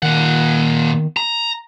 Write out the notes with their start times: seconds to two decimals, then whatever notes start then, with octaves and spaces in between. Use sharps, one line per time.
0.03 A#2 D#3 F#5
1.17 A#5